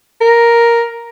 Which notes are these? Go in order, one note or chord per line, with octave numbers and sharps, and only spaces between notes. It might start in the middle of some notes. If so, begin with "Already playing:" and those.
A#4